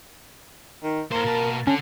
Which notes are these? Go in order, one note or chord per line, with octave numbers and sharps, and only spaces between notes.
D#3
A2 A#3 A#4 C5
B2 A5
D3 C#4 A5